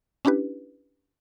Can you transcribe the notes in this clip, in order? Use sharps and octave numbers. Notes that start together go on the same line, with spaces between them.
C#4 D4 E4 G4 B4